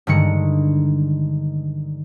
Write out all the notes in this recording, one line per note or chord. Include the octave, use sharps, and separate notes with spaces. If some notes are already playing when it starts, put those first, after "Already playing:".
G2 D3 D#3 G#3 C#7